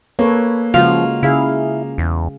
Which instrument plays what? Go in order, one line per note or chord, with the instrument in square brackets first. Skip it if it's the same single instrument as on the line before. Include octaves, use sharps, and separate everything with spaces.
[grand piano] A#3 [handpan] A4 B4 C#5
[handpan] C#3 G#3 F#4 [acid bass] F3 [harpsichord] F4
[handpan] C#3 G#4 F5 [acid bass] E4
[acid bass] E2